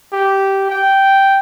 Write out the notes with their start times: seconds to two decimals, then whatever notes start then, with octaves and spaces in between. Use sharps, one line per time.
0.13 G4
0.70 G5